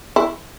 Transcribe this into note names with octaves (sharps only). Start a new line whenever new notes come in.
E4